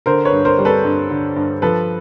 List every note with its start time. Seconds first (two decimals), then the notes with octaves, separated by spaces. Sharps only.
0.06 D3 A#4 C5
0.25 B4 C#5
0.32 G2
0.45 A#4 C5
0.58 G3
0.65 A4 B4
0.84 G2
1.10 D3
1.36 G2
1.62 F3 A4 B4